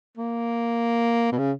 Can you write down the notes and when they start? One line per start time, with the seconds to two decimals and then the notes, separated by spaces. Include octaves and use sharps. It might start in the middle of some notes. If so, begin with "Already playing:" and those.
0.18 A#3
1.32 B2
1.38 C#3